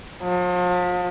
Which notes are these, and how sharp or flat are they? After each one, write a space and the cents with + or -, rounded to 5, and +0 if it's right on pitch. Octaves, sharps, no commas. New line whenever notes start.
F3 +40